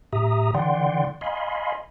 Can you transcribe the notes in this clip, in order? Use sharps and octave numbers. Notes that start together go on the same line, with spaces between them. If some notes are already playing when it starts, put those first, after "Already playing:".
A2 G4 E5 A#5 D#6
D3 E3 D5 F#5 G5 C6
D#5 F5 G#5 B5 C6